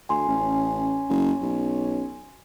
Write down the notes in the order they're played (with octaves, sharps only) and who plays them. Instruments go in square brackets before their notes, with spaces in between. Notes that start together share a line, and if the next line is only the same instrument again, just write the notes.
[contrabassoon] D2 [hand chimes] G#5 C6
[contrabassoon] A1 [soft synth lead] C#4
[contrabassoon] F#1
B1